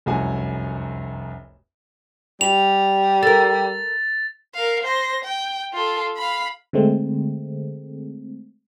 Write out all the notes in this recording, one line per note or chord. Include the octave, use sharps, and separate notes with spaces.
F1 C2 F#2 F#4 G#5
G3 F7
A4 A#4 A6
A#4 F5
C5 A#6
G5
F4 A4
F5 B5
D3 G#3 A3 C4